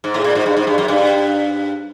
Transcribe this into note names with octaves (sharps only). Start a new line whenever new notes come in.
G#2
A2
A#2
G#2
G2
G#2
G2
F#2
G2